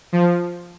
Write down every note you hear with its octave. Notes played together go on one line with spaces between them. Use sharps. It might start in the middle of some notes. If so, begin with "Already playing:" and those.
F3